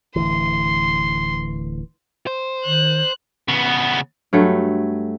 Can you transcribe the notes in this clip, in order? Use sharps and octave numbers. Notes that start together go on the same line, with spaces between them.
D1 D2 E3 C6
C5
D#3 F#6
C#3 B3
G2 F#3 A3 A4